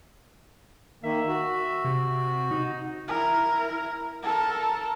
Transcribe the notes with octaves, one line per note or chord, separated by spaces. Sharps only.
D#3 A#3 E5
F#4
C3
D#4
E4 A#4
A4 A#4